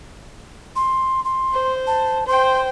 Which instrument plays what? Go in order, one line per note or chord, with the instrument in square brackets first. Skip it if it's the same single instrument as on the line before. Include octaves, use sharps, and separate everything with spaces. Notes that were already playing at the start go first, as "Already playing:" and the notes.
[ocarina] C6
C6
[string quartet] C5
[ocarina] A5
[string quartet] C5 G5 [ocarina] C6